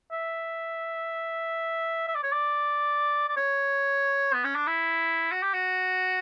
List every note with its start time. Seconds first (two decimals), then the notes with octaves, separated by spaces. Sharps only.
0.12 E5
2.08 E5
2.15 D5
2.23 C#5
2.32 D5
3.29 D5
3.37 C#5
4.33 B3
4.44 C#4
4.55 D4
4.67 E4
5.32 F#4
5.43 G4
5.54 F#4